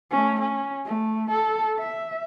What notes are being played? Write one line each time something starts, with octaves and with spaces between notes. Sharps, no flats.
A3 C#4
C#4
A3
A4
E5